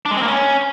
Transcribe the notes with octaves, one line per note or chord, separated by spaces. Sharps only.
D4
G#3
C4
A#3
C#4